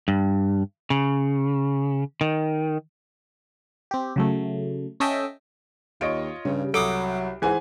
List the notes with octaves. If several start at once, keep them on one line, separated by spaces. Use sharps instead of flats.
G2
C#3
D#3
C4 G4
C#3 F#3 A3
C#4 A4 D#5 E5 G5
D#2 F4 C#5 D#5 D7
G2 C#3 G3 C#4
C2 F#3 A4 D6 D#6 C7 D7
G#2 E3 G#4 C5 F#5 G#5